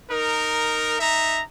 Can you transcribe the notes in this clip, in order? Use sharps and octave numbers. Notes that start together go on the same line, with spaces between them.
D#4 A#4
D#4 E5 A#5